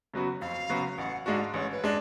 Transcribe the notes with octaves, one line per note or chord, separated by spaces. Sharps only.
C#3 F#3 B3 F#4
F2 F5
C#3 F#3 B3 F#4
A1 F#5
G#2 G#3 D4 F#4 F5
A1 C#5
B4
G#3 D4